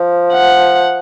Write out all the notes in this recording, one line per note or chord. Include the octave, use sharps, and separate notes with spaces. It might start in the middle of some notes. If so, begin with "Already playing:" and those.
Already playing: F3
F#5